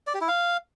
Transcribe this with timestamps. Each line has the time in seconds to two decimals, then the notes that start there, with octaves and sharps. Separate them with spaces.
0.07 D5
0.14 G4
0.21 E4
0.28 F5